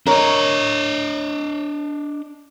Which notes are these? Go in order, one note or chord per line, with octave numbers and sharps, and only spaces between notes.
D4 A#4 C#5 D#5